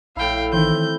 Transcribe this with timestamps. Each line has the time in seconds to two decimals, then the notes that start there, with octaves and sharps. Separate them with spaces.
0.17 A#1 A2 E4 F5 G5
0.53 D#3 E3 C4 G6